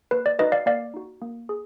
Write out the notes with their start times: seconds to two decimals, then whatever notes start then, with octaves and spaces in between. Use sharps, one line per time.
0.11 A#3 B4
0.26 D5
0.39 D#4 F#4 B4 D#5
0.52 D5 F5
0.66 A#3 D5 F5
0.94 D#4 F#4
1.22 A#3
1.49 G#4